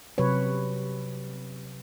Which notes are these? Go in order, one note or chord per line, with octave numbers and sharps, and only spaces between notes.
C3 F#3 B4 C#5